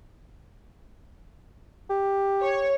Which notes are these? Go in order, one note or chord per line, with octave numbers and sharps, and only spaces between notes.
G4
C#5